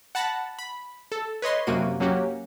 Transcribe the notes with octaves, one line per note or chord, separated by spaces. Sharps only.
F#5 A5 B5 A#6
B5
A4
B4 C#5 D#5 C6
F#2 C3 A#3 F#4 D#7
F#3 A#3 C#4 F#4 G4